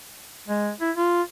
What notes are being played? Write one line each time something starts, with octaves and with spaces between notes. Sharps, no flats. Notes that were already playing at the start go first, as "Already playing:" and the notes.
G#3
E4
F4